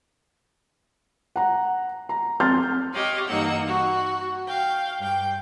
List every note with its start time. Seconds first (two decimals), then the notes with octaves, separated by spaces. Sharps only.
1.36 F#5 A#5
2.09 A#5
2.40 F2 C6 F6 G6 A6
2.94 G4 C#5 D#5 F5
3.27 G2 E3 A#3 D#4 F#5 E6
3.67 F#4
4.47 F5 G5
4.99 G2 G5